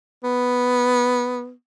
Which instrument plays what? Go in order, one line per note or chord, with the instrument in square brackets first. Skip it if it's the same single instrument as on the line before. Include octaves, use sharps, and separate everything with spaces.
[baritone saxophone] B3